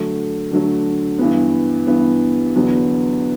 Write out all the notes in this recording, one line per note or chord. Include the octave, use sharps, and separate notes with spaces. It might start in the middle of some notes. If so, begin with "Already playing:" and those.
Already playing: D3 F#3 A3
D3 F#3 A3
G2 E3 B3
G2 E3 B3
E2 D3 F#3 B3